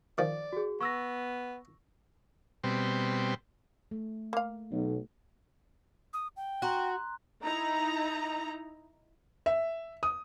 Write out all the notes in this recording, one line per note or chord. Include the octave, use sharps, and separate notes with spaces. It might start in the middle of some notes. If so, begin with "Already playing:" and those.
D#3 F3 D5
F#4 G#4
B3 C#6 E6 A#6
B2 G3 C4
A3
A#3 F5
B1
D#6
G5
F#4 A#5 C6 F#6
D#4 E4 A#5
E5
D#6